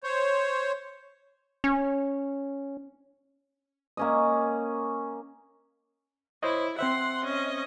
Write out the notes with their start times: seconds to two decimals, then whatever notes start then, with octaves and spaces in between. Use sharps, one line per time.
0.04 C5 C#5
1.64 C#4
3.97 A#3 C#4 D#5
6.43 E4 C5 C#5 D#5
6.79 C4 C5 E5 F#5 C6
7.25 C#4 D#5